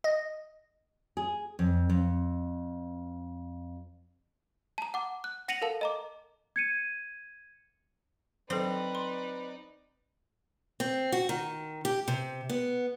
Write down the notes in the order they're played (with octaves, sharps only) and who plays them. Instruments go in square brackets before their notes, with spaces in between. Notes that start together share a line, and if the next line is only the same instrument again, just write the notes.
[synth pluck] D#5
[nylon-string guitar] G#4
F2
F2
[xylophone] A5 A#5
F#5 D6
F#6
F#5 A#6 C#7 D#7 F7 F#7
A4 A#4 F5 A5
D#5 A#5 D6
[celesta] G#6 C#7 D#7
[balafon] F#3 A4 [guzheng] C4 [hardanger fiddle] D#4 D5 [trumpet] B4
[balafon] C6
[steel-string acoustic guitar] C4
F#4
D#3
G4
C3
B3